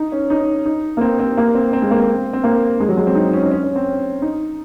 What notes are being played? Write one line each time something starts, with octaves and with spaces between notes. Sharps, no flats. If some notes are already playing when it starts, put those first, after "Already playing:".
Already playing: D#4
C#4
D#4
D#4
A#3
C4
C4
A#3
C4
C4
G#3
A#3
C4
C4
A#3
G#3
F#3
G#3
C4
D#4
C#4
D#4
C#4
C#4
C4
D#4